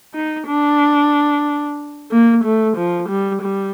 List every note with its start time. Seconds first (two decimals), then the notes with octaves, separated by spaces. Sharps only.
0.14 D#4
0.47 D4
2.11 A#3
2.44 A3
2.77 F3
3.09 G3
3.42 G3